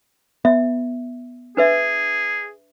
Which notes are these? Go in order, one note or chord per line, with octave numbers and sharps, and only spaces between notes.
B3 E5
D4 G#4 B4 E5